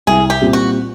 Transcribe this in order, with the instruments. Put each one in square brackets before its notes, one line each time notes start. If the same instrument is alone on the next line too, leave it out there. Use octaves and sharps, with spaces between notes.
[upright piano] C2 [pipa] G#4
[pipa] G4
[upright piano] A#2 G3 C4
[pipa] F#4